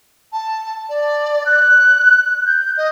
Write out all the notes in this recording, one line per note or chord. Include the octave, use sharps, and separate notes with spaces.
A5
D5
F#6
G6
D#5